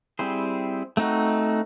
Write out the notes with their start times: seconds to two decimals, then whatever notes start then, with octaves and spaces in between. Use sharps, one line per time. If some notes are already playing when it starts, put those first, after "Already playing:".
0.19 G3 C4 E4 G#4 C5
0.97 A3 C4 D#4 F#4